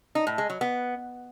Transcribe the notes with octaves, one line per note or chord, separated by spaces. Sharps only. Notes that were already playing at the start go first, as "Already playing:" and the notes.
D#4
A2
G#3
F#3
B3